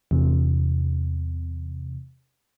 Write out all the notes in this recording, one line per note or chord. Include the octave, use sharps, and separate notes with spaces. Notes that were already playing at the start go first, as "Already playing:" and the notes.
E2 C3